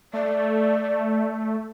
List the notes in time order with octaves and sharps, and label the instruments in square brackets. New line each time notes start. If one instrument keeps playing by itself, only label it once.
[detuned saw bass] A3 [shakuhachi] D5